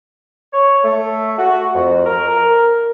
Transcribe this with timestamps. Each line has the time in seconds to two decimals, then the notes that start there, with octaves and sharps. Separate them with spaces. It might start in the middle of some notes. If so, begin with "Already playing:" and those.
0.53 C#5
0.84 A3
1.38 F#4
1.74 F2
2.05 A#4
2.28 A#4